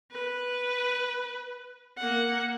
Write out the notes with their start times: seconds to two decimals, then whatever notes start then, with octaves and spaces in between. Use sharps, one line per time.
0.11 B4
1.97 A#3 F#5